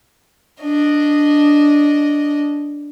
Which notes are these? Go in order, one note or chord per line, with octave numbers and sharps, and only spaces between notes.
D4 D#5